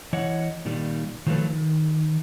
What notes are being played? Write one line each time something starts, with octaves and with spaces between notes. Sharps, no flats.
E3 C#5 D#5 F#5
A#2 D#3 G3
D#3 F3 F#3 A3 A4 B4
D#3